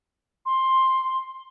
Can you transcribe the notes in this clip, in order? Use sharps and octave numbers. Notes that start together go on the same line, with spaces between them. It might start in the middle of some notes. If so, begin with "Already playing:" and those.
C6